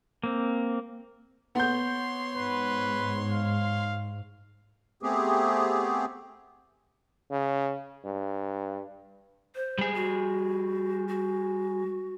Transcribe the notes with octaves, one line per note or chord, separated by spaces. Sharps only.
A#3 C4
B3 C#5 C6 G6
G#2 B4
F5
A3 B3 C4 G4 G#4
C#3
G2
C5
G3 G#4
F#4
F#4